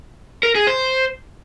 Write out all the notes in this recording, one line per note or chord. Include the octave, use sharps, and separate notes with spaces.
A#4
G#4
C5